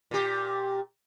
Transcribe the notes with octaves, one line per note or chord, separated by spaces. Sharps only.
A#2 G4